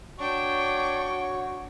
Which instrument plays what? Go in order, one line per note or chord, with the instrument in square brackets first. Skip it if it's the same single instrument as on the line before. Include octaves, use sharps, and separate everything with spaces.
[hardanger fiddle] D4 G5 [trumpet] F#4 [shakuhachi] C#5 [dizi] C#6